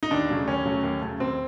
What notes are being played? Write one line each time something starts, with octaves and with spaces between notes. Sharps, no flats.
D#4
D#2 D4
C#3 F#3 A3
D#2 C#4
C#3 F#3 A3
D#2
C#3 F#3 A3
D#2 C4